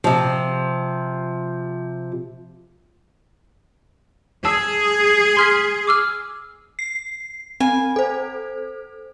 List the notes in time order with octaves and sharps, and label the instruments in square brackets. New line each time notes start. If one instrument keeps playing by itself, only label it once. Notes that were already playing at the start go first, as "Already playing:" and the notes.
[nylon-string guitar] C3 F3
[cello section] G#4 [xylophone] A5 E6
[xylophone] C6 F6 B6
D6 E6 F6
[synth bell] C7
[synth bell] C4 [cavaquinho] G#5
[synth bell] A4 C5